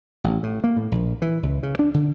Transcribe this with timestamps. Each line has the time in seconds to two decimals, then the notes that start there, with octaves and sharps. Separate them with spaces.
0.24 A1
0.43 A2
0.64 A#3
0.76 A2
0.92 A#1
1.22 E3
1.43 C#2
1.63 C#3
1.79 D4
1.94 D3